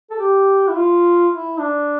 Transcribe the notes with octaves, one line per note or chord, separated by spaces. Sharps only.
A4
G4
E4
F4
E4
D4